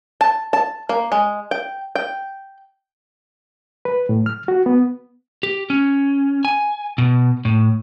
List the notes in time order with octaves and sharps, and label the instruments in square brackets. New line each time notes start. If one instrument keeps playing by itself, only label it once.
[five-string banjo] A5
A5
A#3
G#3
G5
G5
[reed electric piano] B4
A2
F6
F#4
B3
[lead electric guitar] G4
C#4
G#5
B2
A2